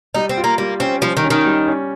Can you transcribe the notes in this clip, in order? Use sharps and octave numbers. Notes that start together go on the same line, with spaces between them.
G3 D#4
C4
F4
A#3
G3 A#3
C4 C#4
F3 G3
D#3
C#4
D#3
G3
C#4